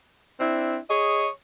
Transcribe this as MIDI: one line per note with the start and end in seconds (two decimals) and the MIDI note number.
0.39 0.77 60
0.39 0.77 62
0.39 0.77 64
0.88 1.26 68
0.88 1.26 73
0.88 1.26 75